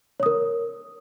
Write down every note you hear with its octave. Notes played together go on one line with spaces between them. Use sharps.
A#4 C#5 D#6